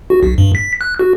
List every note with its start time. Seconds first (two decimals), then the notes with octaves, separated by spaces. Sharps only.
0.10 F#4
0.23 B1
0.38 G2
0.55 B6
0.81 F#6
0.99 F#4